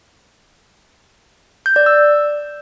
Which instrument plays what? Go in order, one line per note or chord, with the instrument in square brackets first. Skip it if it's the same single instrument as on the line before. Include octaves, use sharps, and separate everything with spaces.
[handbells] G6
D5
E6